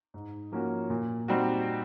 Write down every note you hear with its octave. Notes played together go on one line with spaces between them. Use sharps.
G#2
F3 A#3 C#4 F#4
A#2
G3 C4 D#4 F#4